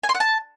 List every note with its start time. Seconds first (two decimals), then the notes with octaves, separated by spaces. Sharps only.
0.04 G#5
0.09 C6
0.15 F#5
0.20 A5